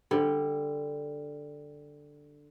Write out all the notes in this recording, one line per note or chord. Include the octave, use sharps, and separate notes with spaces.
D3 G3